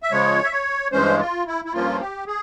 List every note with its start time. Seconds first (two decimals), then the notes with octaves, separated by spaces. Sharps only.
0.03 E5
0.12 C#3 F3 G#3 C#5
0.44 E5
0.52 C#5
0.92 G2 E3 G#3 C#4 C5
1.19 F4
1.47 E4
1.65 E4
1.73 G2 F3 A#3 C#4 F4
2.00 G4
2.27 G#4